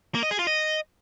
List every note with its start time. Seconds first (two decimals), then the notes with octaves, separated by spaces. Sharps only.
0.15 A#3
0.23 D#5
0.31 G#4
0.39 F4
0.47 D#5